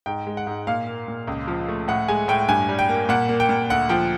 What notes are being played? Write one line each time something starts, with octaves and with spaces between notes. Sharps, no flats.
G#2 G5
G#3
F#5
G#2
A#2 F5
A#3
A#2
C#2
F3
A3
A2 F#5
G#3 G#5
A2 G5
G2 G#5
G3
G5
A#3
A#2 F#5
A#3
G5
A#2
D2 F#5
F3 G5